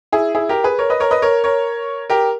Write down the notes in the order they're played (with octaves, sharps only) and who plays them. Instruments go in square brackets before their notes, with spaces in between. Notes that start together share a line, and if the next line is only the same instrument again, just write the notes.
[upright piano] E4 G#4
E4 G#4
G4 A#4
G#4 B4
A#4 C#5
B4 D#5
A#4 C#5
B4 D#5
A#4 C#5
A#4 C#5
G4 A#4